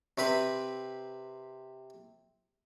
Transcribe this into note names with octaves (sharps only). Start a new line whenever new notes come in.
C3 C4 B4 B5